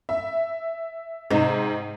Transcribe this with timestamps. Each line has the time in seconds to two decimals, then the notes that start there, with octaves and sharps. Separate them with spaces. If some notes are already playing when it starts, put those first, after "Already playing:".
0.09 E5
1.30 G#2 C3 D#4